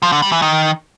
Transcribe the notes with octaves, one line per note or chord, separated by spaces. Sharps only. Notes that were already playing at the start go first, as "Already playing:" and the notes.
F3
D3
G3
E3
D#3